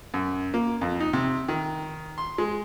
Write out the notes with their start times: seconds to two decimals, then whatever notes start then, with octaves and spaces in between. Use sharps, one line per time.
0.14 F#2
0.54 A#3
0.81 F2
1.00 D#4
1.13 C3
1.48 D#3
2.18 C6
2.38 G#3